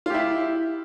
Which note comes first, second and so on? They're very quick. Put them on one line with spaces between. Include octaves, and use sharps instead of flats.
F4 G4 E4